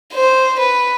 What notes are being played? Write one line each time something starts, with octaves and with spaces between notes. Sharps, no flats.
C5
B4